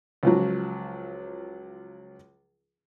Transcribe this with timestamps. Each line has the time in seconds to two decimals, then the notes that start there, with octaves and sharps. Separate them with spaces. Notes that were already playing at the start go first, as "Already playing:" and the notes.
0.23 C#2 F3 F#3